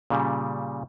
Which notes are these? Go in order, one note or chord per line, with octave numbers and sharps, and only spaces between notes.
A#2 C#3 G3